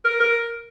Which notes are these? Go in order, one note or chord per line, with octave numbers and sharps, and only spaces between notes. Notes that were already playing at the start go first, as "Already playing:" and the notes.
A#4
A#4